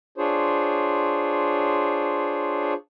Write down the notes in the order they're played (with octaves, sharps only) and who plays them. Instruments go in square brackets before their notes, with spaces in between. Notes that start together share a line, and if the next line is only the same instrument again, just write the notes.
[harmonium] D4 F4 G#4 C5 C#5